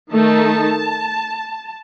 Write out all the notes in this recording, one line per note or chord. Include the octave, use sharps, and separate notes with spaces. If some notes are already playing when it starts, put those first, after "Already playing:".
D#3 A3 D#4 A5